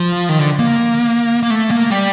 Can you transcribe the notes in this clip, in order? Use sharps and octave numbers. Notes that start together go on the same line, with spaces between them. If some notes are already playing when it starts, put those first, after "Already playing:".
Already playing: F3
D#3
D3
A#3
A#3
A3
A#3
G3